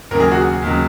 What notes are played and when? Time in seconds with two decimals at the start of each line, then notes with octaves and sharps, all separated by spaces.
0.11 D#2 C#3 F#3 A#4
0.20 G#4
0.32 F#4
0.41 G#4
0.62 D#2 C#3 F#3